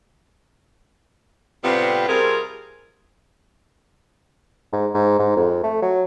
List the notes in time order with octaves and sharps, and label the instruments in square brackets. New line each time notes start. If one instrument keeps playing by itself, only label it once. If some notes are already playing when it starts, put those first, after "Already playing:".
[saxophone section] A2 C3 G3 B3 C4 F4
C3 G3 C4 F4 G#4 A#4
[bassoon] G#2
G#2
G#2
F2
A3
F#3